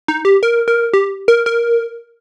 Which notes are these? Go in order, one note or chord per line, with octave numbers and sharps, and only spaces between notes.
D#4
G4
A#4
A#4
G4
A#4
A#4